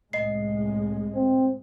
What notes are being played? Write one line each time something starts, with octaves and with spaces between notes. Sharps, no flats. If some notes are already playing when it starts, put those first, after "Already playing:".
C2 A2 G#3 D#5 C7
C4